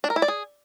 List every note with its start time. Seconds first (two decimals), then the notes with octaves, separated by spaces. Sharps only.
0.04 D4
0.10 A#4
0.16 E4
0.22 D5
0.28 G#4